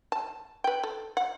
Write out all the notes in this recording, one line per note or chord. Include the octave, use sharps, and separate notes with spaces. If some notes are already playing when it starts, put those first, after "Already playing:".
A5
B4 G5
A4
F#5